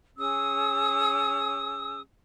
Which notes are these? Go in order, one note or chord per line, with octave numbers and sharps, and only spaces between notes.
C#4 G#4 D#6 E6